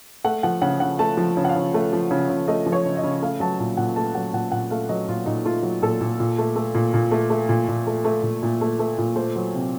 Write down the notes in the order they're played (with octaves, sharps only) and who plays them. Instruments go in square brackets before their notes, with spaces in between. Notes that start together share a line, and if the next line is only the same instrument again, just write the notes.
[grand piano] A3 F#5
F3 F#5
C#3 F#5
C#3 F#5
A3 A5
F3
C#3
F#5
F5
C#3
A3
F3
C#3
C#3
A3 D#5
F3
C#5
C#3
D#5
C#3
A3 F5
F#3 A5
A#2 A5
A#2 F#5
A3 A5
F#3 F#5
A#2 F#5
A#2 F#5
A3 F5
F#3 D#5
A#2 F4
A#2 D#4
A3 F4
F#3
A#2 A4
A#2
A#2
A3
A3
A#2
A#2
A3
A3
A#2
A#2
A3
A3
A#2
A#2
A3
A3
A#2
A3 C5
F#3
C3